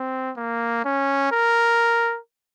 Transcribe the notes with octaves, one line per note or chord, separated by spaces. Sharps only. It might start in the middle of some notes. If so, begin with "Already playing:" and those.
Already playing: C4
A#3
C#4
A#4